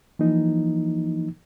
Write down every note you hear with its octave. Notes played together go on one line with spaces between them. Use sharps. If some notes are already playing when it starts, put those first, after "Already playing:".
E3 F3 A#3 D#4